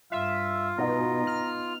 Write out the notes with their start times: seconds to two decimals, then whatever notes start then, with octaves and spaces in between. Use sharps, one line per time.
0.12 G2 F4 E5 F5
0.78 B2 B3 D#4 A#5
1.27 F6